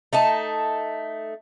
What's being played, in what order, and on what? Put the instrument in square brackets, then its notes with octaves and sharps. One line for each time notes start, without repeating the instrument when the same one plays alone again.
[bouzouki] A3 D#4 A5